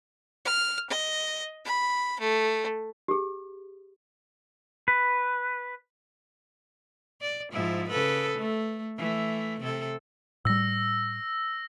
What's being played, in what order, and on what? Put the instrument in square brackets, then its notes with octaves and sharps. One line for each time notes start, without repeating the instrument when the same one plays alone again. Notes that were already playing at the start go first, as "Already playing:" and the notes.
[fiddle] F6
D#5
B5
A3
[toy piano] G4 G#4
[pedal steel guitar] B4
[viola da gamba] D5
G#2 F3 E4
C#3 A4 B4
A3
E3 A3
C3 A4
[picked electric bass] A2 G3 [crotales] E6 A#6